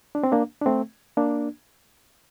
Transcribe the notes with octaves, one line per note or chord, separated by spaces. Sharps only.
D4
C4
A#3 D4
D4
A3 C4
A#3 D4